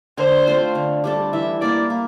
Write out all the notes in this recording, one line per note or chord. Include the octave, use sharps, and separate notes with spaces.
D3 C5
A3 C4 F4
D3
G3 D4 A4
E3 E5
A#3 E4 D5
A#3